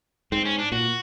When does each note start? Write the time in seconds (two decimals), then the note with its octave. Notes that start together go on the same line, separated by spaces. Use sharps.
0.32 G#2 C4
0.45 C#4
0.59 D4
0.72 A#2 F#4